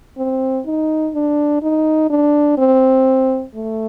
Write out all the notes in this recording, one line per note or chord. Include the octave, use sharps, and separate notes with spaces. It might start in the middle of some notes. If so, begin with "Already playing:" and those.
C4
D#4
D4
D#4
D4
C4
A3